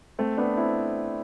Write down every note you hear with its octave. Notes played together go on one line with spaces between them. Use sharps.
A3 C4
B3 D4
C4 E4